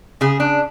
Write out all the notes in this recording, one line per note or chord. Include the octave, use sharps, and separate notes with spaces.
C#3 G#4
D4